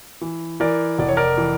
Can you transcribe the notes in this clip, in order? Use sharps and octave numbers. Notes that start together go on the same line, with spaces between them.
E3
E3 A#4 D5
F1 D5
C#5
A#4 D5
E3